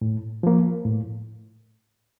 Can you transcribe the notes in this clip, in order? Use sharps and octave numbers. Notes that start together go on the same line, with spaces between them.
A2
F3 A#3
A2